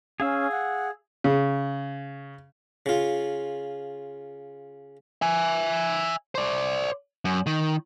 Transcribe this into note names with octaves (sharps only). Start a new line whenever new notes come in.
C#4 G#4 F5 E6
F#5
C#3
C#3 F4
E5 G#5
C5 D5
F#2
D#3